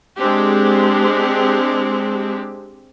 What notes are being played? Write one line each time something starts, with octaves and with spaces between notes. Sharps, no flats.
G#3 C4 D4 G4